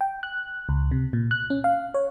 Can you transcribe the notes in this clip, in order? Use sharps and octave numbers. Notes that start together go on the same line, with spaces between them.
G5
F#6
C#2
C3
A#2
F#6
C#4
F5
C#5